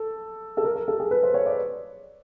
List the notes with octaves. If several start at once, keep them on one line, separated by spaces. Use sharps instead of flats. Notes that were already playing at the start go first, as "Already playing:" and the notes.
Already playing: A4
A4
A#4
A#4
A4
G#4
B4
C5
C#5
D5